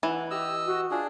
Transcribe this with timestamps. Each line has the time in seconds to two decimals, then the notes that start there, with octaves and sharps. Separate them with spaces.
0.03 E3 F#5
0.31 G4 D#5 E6
0.66 F#4
0.91 D4 F4 G#4